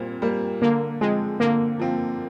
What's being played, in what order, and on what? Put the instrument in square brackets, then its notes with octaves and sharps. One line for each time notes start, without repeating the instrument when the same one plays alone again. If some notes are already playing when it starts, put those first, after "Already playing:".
Already playing: [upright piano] A#2 G3 A#3 [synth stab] C4
[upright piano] G3 A#3
[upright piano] D3 [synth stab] A#3
[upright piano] F3 C4 [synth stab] G#3
[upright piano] D3 [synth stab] A#3
[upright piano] F3 C4